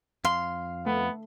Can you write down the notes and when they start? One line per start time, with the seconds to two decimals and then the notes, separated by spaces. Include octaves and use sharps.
0.25 F2 F5 C6
0.86 A3 B3